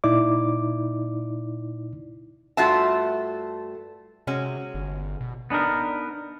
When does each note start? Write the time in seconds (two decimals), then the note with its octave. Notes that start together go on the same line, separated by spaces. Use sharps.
0.04 A#2 D#4 E4 D5 D6
2.57 G2 A3 F4 F#4 E5 A5
4.27 C3 G#3 C#4 F#4
4.74 G1
5.21 B2
5.50 B3 D4 D#4 A#4